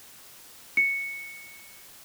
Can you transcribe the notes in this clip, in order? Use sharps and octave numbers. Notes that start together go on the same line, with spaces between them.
C#7